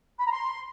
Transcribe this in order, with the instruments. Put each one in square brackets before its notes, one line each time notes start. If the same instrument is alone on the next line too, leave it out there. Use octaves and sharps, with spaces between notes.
[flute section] B5
A#5
C6